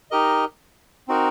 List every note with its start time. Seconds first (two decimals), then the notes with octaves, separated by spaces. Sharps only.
0.11 D#4 G4 A#4 D#5
1.08 C4 D#4 F#4 A#4